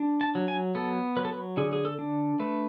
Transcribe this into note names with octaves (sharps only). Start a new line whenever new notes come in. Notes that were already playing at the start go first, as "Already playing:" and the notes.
Already playing: D4
A5
F#3
G#5
B3 A4
F#3 B4
A4
B4
D3 G#4
G#4
A4
D4
A3 B4